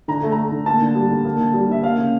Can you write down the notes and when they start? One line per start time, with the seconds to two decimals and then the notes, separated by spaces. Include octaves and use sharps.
0.08 D3 A#5
0.22 A3
0.32 A#5
0.37 A3
0.52 D3
0.66 A#3 A5
0.82 D3
0.95 G3
1.11 D3
1.25 A#3
1.40 D3
1.54 G3
1.69 D3 E5
1.83 A#3 F5
1.98 C#3